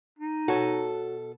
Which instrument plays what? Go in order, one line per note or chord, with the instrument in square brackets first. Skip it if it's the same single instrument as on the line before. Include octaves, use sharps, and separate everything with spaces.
[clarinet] D#4
[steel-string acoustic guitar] B2 A4 [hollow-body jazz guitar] F#4 C#5